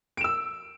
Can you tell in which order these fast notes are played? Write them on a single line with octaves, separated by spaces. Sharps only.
D7 E7 E6